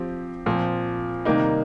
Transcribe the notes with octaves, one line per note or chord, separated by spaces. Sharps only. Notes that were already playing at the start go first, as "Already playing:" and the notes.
Already playing: F3 C4 G4
A#2 F3 C4
C3 D#3 G3 A#3 D#4